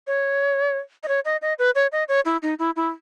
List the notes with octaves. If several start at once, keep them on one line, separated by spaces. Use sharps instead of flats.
C#5
D#5
C#5
D#5
D#5
B4
C#5
D#5
C#5
E4
D#4
E4
E4